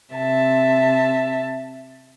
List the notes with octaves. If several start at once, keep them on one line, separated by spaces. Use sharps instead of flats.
C3 E5 A5